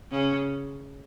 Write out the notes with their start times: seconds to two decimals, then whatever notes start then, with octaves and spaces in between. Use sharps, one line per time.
0.11 C#3 C#4